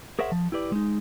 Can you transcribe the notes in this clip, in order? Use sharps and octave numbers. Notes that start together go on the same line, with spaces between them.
G#4 A#4 C5 C#5 E5 F#5
F3
E4 G4 B4 D5
G#3 D#4